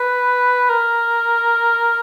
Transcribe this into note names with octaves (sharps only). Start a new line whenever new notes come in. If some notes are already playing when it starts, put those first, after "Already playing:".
Already playing: B4
A#4